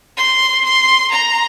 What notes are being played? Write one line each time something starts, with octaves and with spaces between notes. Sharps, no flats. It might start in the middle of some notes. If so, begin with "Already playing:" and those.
C6
C6
A#5